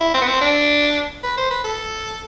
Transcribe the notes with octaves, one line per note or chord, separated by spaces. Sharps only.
E4
C4
B3
C4
D4
B4
C5
B4
A4